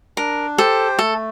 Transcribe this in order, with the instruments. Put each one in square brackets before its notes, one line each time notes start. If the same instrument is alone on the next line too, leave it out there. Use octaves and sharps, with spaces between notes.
[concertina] D4 [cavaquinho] A#4
[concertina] G4 C5 G5 [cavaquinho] A4
[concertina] A3 [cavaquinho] A4